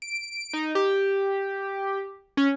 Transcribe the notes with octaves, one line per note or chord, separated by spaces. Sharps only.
D7
D#4
G4
C#4